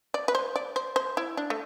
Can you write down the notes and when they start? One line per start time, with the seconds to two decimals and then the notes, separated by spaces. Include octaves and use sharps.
0.14 D5
0.28 B4
0.35 C5
0.56 D5
0.76 C5
0.96 C5
1.17 E4
1.37 D4
1.50 A3